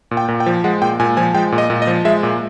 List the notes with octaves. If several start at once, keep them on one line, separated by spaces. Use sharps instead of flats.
A#2
G5
A#2
G5
F3
G#3 F#5
A#2 G5
A#2 G#5
F3 G#5
G#3 G5
A#2
D#5
A#2
D#5
F3
G#3 E5
A#2